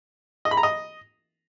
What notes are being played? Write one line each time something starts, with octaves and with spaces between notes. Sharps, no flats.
D#5
B5
A#5
D#5